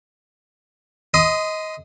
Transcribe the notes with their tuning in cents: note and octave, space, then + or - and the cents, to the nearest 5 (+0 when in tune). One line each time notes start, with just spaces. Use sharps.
D#5 +20 C6 -25 D#6 +0